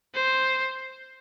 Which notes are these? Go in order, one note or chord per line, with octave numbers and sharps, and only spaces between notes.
C5